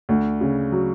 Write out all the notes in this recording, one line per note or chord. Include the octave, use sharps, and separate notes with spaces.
D2
C#3
F#3